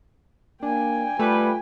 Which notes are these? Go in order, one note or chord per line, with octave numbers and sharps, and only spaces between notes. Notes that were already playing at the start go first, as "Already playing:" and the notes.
A#3 D4 G5 G#5
G3 A3 F4 B4